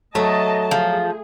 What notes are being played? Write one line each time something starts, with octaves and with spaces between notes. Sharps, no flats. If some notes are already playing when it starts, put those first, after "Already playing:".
F#3 A3 D#5 A5
F3 G#4